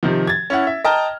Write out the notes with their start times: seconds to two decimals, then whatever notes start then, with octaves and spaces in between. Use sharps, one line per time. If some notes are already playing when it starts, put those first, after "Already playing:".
0.03 C3 D#3 F3
0.27 G#6 A6
0.50 C#4 E4 F#5
0.67 E5
0.84 D#5 G5 A5 A#5 F6